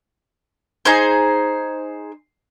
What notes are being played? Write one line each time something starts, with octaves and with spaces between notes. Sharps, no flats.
D#4 G#4 C5